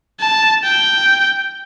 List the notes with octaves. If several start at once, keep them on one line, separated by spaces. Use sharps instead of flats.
A5
G5